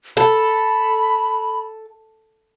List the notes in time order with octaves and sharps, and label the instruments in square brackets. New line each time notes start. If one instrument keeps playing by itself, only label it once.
[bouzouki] A4 [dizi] B5